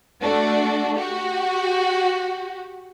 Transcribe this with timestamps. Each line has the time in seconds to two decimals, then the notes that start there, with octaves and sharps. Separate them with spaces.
0.22 A3 D4 F#4
0.98 F#4 G4